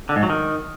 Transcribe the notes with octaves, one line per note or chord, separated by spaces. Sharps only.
D3
G#2
F#3
D#3